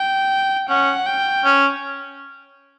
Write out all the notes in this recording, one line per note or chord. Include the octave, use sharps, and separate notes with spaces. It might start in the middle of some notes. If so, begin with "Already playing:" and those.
Already playing: G5
C#4 F#5
G5
C#4